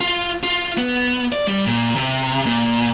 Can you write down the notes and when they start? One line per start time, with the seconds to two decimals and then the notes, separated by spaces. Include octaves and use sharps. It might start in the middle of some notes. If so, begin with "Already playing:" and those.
0.01 F4
0.43 F4
0.78 B3
1.32 D5
1.47 G3
1.67 A#2
1.96 C3
2.46 A#2